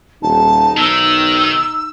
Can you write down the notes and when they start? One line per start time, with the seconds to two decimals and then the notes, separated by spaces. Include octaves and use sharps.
0.22 D#1 D#4 A5
0.77 B1 D#3 E6